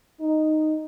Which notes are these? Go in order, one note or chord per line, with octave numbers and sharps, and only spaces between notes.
D#4